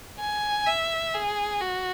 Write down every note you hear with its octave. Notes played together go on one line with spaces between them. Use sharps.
G#5
E5
G#4
F#4